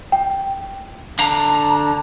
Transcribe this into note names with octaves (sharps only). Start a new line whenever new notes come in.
G5
D3 A5 A#5